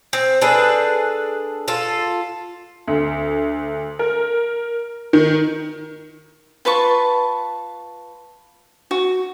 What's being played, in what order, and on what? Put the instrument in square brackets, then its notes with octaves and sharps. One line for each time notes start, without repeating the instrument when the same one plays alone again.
[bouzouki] C4
D4 G#4 A4 B4
F4 A4
[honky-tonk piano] D2
A#4
D#3
[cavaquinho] F4 B4 A5 C#6
F#4